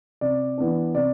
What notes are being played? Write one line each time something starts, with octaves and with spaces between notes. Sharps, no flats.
C3 D5
E3 B3 D4
C3 D5